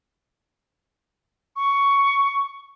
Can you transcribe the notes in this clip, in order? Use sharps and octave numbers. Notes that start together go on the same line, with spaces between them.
C#6